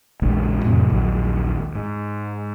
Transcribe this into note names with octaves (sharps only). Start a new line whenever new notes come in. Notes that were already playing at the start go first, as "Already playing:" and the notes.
A#1 E2 C#3 G#3
F2 A2 C3 F#3
A#1 D#2 F#3
G#2